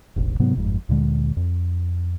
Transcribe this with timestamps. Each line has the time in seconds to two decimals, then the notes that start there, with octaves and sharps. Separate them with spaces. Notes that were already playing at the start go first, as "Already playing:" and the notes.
0.16 E1 A1
0.39 G#2 C3 F#3 B3
0.57 G1 F2 G#2
0.89 D2 A#2 D3 G#3
1.37 F2